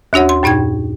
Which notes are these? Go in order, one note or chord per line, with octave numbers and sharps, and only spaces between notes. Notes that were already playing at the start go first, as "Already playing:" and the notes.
D#2 D4 F#4 C#5 F#5
C6
F#2 A#2 D#4 G5 G#6